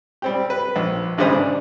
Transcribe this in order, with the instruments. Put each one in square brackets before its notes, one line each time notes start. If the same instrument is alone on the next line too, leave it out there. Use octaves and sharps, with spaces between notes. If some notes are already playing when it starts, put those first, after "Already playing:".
[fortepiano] G3 C4 G4
B4
A#1
G#1 G2 C#3 E3 C5 D#6
D4